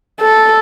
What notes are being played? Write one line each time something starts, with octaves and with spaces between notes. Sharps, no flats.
A4